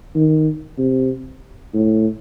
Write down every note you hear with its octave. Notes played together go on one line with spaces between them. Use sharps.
D#3
C3
A2